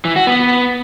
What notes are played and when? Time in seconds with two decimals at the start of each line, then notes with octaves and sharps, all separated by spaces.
0.05 E3
0.16 F#4
0.27 B3